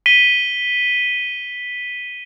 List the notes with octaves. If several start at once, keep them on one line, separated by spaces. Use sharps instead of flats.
B6 D#7 G7